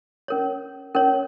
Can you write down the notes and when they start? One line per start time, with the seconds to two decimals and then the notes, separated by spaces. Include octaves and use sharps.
0.28 C#4 A#4 C#5
0.95 C#4 A#4 C#5